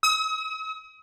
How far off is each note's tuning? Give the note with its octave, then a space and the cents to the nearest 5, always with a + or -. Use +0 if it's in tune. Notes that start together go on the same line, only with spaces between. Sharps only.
D#6 +40